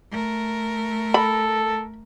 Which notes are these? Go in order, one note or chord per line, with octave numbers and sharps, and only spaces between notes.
A3 A#4
A4 B5